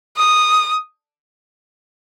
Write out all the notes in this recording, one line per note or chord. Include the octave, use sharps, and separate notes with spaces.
D#6